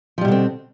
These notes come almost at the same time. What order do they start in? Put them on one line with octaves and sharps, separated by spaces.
F3 G3 B2 D3 C4